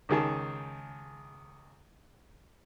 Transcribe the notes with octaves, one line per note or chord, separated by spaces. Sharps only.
C#2 D#3 G#4 A5